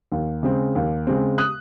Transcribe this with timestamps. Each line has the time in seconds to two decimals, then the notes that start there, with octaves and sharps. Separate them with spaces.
0.12 D#2
0.43 C#3 G#3 C4
0.75 D#2
1.07 C#3 G#3 C4
1.38 D#6 F#6